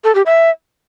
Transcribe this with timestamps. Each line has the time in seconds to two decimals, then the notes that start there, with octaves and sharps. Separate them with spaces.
0.04 A4
0.15 G4
0.26 E5